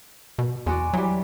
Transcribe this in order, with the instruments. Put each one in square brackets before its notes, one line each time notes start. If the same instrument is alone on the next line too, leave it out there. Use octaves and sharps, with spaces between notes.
[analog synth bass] B2
[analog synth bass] E2 [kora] G#3 F#4 D5
[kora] E3 G3 [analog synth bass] F#3